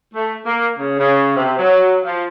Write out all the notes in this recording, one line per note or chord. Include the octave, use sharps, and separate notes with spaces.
A3
A#3
C#3
C#3
C3
F#3
F3